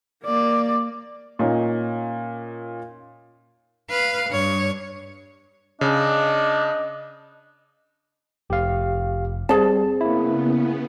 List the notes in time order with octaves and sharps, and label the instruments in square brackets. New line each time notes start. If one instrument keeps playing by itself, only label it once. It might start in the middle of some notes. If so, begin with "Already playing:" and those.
[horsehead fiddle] A#3 D5
[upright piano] A#2 C#4 D#4
[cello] B4 F5
G2 C#5
[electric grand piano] C#3 [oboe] D4 [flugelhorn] D#5
[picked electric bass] F1 [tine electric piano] G4 F5
[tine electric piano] G3 [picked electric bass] C4 [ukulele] G#4 A5
[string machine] C#3 B3 [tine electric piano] A#3 E4